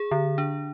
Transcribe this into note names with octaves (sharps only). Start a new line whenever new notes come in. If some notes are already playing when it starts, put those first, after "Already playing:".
Already playing: G#4
D3
D4